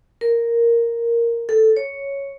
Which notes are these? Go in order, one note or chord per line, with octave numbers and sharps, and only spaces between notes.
A#4
A4
C#5